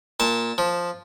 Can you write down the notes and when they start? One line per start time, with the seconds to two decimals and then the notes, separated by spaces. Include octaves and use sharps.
0.20 A#2 A5
0.58 F3